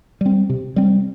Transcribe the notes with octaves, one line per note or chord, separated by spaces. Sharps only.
G3 C4
C3
G3 C4